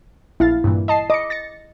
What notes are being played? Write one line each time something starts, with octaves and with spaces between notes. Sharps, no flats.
A#1 E4 F5 A6
G2 A#2 E3
D#5 A5 C7
D#5 D6 C#7
A6 A#6 C#7